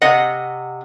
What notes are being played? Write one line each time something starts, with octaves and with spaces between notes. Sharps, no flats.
C3 D#5 F#5